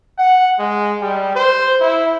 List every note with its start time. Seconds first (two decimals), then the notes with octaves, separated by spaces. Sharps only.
0.18 F#5
0.59 G#3
1.01 G3
1.35 C5
1.81 E4